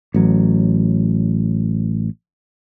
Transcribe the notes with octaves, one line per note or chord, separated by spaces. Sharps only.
A1 F#3